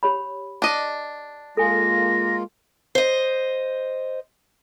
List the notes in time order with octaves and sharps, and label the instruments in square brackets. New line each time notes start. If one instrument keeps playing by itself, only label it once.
[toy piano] G4 C#5 B5
[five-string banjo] D4 D#5
[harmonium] G#3 A#3 F4 [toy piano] A4 G#5 [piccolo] A#6
[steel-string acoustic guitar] C5 D#5